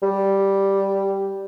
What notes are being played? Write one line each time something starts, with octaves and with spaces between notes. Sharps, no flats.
G3